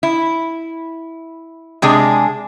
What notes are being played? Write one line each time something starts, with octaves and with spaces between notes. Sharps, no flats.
E4
C3 G#3 D4 G#4